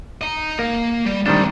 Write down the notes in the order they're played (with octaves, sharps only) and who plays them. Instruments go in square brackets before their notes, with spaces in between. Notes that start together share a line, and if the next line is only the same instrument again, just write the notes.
[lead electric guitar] D#5 A#5
[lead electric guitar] A#3 [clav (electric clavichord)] A#4
[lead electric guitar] G3
[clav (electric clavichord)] D#3 G3 D4 [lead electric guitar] A3 C4